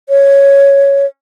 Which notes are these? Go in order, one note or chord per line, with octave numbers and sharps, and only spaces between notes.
C#5